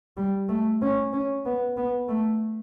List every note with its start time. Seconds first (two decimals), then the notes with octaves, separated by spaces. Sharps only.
0.17 G3
0.49 A3
0.81 C#4
1.13 C#4
1.46 B3
1.77 B3
2.08 A3